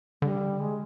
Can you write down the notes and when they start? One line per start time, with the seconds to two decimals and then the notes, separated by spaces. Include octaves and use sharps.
0.22 D3 G3
0.60 G#3